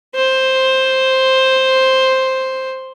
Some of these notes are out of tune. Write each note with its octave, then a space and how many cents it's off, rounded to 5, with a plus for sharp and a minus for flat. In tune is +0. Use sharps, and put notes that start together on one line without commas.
C5 +5